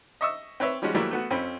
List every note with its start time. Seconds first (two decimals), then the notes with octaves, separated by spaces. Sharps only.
0.21 D#5 E5 C#6 D#6 E6
0.60 C4 B4 C#5 E5
0.82 F3 G3 G#3 C#4 F#4
0.95 E3 F#3 G3 A3 A#3 E4
1.11 A3 B3 F#4
1.31 F2 C4 C#4 B5